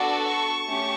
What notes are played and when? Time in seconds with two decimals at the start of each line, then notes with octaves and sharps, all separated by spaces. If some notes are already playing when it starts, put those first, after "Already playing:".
Already playing: B3 D4 F#4 A4 D5 F#5
0.28 A5 C#6
0.65 A3 C#4 G4